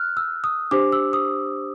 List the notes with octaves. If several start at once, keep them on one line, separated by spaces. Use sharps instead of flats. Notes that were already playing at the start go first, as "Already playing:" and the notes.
Already playing: F6 F#6
E6
D#6
D4 G4 C5 D6
E6
D#6